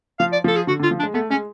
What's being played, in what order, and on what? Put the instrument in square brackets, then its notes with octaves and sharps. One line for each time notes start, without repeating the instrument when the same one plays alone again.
[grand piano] F3 [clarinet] F5
[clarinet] D5
[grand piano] F3 [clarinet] A4
[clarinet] G#4
[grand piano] D3 [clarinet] F#4
[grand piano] D3
[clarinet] F4
[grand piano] F3
[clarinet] D4
[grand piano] G#3
[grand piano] A3 [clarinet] B3
[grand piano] G#3 [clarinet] C#4